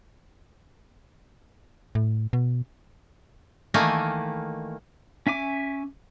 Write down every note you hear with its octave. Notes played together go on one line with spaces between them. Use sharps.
A2
B2
D#3 E3 A3 A#3 G#5
C#4 E5 G#5 D6